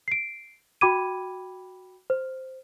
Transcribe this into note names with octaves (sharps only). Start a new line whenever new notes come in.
C7 D7
F#4 G5 B5 D6 G#6 D#7
C5